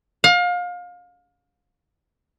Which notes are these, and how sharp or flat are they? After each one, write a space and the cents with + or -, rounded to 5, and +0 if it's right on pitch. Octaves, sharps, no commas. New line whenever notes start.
F5 +30